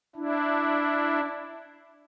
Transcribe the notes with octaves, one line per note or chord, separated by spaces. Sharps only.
D4 E4